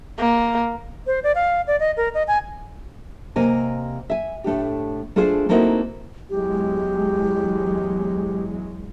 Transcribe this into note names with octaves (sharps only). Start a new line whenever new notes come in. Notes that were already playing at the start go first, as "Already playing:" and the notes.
A#3
C5
D5
F5
D5
D#5
A#4
D#5
G#5
C3 A#3 D#5 G#5
E5 G#5
A2 A3 D4 G4
A3 D4 F4 G#4 C5
A3 A#3 C4 D#4 E4 F#4
E2 F#3 G#3 G4